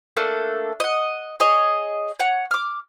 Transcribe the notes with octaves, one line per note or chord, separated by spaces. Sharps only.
A3 A#3 D4 A4
D#5 F#5
G#4 C#5 D#5
C#5 F#5
D6 F6